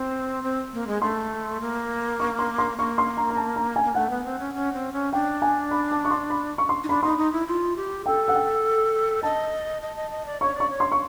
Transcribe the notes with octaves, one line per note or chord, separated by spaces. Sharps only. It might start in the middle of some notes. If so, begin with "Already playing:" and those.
Already playing: C4 C6
C4
A#3
G#3
A3 C6
A#3
C#6
C6
C6
A#3 C#6
C6
A#5
A#5
A5
A#5
G#5
A#3
A3 F#5
B3
C4
C#4
C#4
C4
C#4
D4 G5
G#5
B5
A5
C#6
C6
B5
C#6
C6
D#4
D4 B5
D#4 B5 C6
D#4
E4
F4
G4
A4 G5
F#5
G5
D#5 A5
D#5
D#5
D#5
D5
C#5 C#6
D5 C#6
C#5
C6
C#6